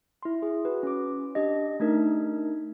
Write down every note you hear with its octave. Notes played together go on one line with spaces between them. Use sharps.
E4 C6
G#4
F#4 B4
C#4 D6
D4 G4 D#5
A3 D4 D#4 A#4